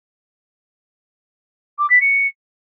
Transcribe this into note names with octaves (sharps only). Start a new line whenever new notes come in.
D6
B6
C#7